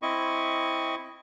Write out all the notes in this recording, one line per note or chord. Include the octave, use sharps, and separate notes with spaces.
C4 E4 D#5 C#6